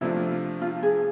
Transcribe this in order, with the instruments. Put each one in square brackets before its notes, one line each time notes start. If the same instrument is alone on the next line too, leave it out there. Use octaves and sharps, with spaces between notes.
[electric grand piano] C3 F3 A3 D4 [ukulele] E4
[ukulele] F4
F4
F4
G#4